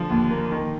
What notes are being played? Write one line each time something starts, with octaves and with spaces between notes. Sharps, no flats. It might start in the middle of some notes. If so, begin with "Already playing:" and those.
Already playing: D3 F3
D#2
A#3
D#3